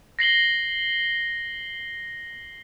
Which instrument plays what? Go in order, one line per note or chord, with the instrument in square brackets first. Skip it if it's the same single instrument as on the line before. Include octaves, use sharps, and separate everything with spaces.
[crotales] A#6 C7 F#7 G7